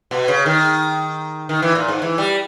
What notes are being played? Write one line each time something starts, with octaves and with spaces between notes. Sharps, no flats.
B2
C#3
D#3
D#3
E3
A#2
G#2
E3
G3